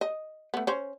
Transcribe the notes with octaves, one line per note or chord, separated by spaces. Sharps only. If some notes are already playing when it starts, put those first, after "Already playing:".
D#5
A3 B3
C#4 C5